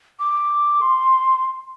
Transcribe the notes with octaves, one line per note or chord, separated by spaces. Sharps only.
D6
C6